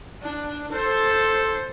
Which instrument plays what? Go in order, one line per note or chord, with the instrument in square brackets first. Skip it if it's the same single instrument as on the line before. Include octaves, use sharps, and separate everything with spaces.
[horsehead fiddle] D4
[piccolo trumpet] A4 [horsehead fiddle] C5